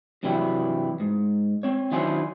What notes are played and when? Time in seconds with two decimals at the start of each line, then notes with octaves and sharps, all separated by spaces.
0.23 G2 C3 E3 F#3 G3 E4
1.00 G#2
1.63 C4 C#5
1.92 D#3 F#3 D4 E4 C5 G#5